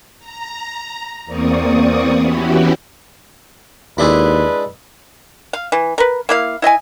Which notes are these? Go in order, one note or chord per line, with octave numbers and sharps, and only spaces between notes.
A#5
E2 A#3 C4 D5 C#6 D#6
E3 B3 C#4 E4 F#4 G4
D#2 G#3 D4 E4 B4
F5
E3
A#4 B4
A#3 E4 F5
E4 D#5 E5 G#5